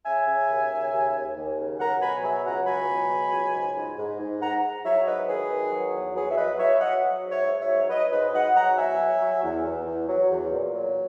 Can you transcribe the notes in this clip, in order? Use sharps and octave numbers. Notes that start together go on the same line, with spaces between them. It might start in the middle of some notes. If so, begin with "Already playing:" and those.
C#3 E5 G#5
C#3
D#2
C#3
D#2
D#2
D#2
C#3
F#3 F#5 A#5
B2 G#5 B5
F#3 E5 G#5
C#2 F#5 A#5
F#3 G#5 B5
B2
F#3
C#2
G#2
G#2
G#2
G#2
G#2 F#5 A#5
G#2
F#3 C#5 E5
G#2 B4 D#5
D#3 G#4 B4
D#3
F#3
E2
F#3 G#4 B4
E5
F#3 B4 D#5
F#3 C#5 E5
F#3 D#5 F#5
F#3
G#2
C#5 E5
G#2
C#5 E5
F#3
F#3 B4 D#5
G#2 B4 D#5
G#2 D#5 F#5
F#3 F#5 A#5
E2 E5 G#5
F#3
F#3
E2
E2
E2
F#3
E2
A#2
F#3